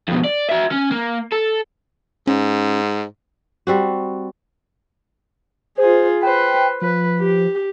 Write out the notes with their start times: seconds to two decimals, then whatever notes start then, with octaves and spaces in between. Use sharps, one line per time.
0.08 F2 B2
0.24 D5
0.49 F#4 E5
0.72 C#4
0.92 A#3
1.32 A4
2.27 G#2 C#4
3.67 G3 C4 F#4
5.78 F4 G#4 C5
6.22 B4 C5 G5
6.82 F3 B4
7.19 G4